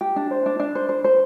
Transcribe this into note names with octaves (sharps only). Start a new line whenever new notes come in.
G4
D4
C5
D4
D4
C5
C5
C5